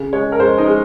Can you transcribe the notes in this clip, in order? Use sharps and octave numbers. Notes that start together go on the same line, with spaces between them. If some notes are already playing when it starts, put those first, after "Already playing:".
Already playing: C#3
G#3 C#5
A#4
G#3 C5
D#4
G#3